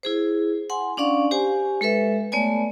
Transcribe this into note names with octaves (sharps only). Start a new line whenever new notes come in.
E4 G#4 C5
F#5 G#5 C6
C#4 D4 D5 F5 C#6
G4 C5 G#5
G#3 A4 B4 E5
A3 B3 C#5 D5 G#5